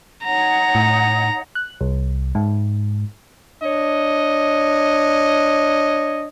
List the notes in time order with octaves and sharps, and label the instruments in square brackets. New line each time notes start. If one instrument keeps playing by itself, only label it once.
[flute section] D#4 C#5 F#5 [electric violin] A#5
[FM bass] A2
[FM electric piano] F#6
C2
G#2
[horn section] D4 C#5 D#5